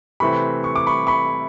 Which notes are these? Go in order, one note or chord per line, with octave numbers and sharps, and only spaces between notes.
C3 E3 A3 C4 B5 C#6
C#6
D6
B5 C#6
B5 C#6